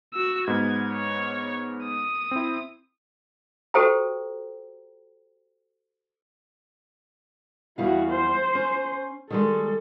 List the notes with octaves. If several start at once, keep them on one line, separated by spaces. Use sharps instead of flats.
F#4 E6
G#2 B3 G#6
C#5
D#6
C4 E4
F#4 G4 A4 C5 G5 A#5
E2 G3 E4 F#4 F5
C5
C#4
D#3 G3 G#3 A4